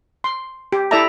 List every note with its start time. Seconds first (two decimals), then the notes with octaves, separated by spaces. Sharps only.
0.24 C6
0.72 G4
0.91 E4 A4 D5 E5 A5 A#5